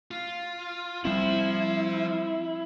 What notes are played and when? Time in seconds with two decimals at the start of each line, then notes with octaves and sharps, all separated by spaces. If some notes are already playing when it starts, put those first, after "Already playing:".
0.11 F4
1.05 F3 G3 C4 E4 C5